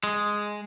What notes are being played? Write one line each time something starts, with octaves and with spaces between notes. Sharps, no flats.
G#3